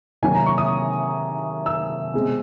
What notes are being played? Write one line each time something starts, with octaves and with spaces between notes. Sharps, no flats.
C3 D#3 F#3 A#3 C#4 G#5
A#5
C#6
D#6
E6
B2 G#3 C4